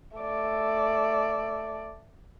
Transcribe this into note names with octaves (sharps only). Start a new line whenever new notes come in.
A3 D5